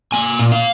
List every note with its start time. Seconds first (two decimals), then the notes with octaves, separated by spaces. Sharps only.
0.12 A#3 G#5
0.39 A#2
0.52 F5